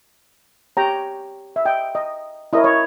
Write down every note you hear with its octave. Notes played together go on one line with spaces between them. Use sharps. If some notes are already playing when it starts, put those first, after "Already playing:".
G4 C#5 G5 A#5
E5
D#5 G5
D#5
E4 A#4 C#5 D#5
C#5